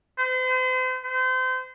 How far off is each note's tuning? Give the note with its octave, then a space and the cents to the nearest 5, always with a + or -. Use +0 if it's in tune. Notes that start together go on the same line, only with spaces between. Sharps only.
C5 -40
C5 -30